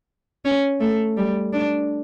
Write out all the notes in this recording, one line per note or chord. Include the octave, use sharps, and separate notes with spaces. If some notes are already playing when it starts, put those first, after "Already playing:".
C#4
A3
G3
D4